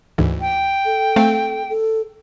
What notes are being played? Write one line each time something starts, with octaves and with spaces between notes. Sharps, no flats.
D2 G#2 E3
G5
A4
A3 C4 F5
A4